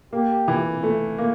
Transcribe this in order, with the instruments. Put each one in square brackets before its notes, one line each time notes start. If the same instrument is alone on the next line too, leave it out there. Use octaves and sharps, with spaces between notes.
[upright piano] A#3 [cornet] G4
[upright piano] E3
A3
A#3